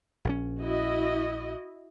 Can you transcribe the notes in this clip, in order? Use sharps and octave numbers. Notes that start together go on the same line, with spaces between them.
A#1 D3 C#4
E4 F#4 D#5